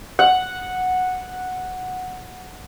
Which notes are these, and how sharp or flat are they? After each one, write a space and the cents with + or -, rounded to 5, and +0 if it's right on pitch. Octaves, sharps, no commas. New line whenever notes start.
F#5 -5